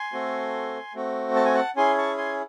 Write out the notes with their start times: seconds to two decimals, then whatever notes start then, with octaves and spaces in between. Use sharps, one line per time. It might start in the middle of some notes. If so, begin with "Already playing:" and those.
Already playing: G#5 C6
0.13 A3 C4 F#4 A4
0.94 A3 C4 F#4
1.36 A5
1.45 G#5
1.54 F#5 A5
1.76 C#4 E4 G#4 G#5 C6
1.98 A5 C#6
2.18 G#5 C6